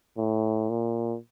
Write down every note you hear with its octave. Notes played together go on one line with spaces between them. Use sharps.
A2
A#2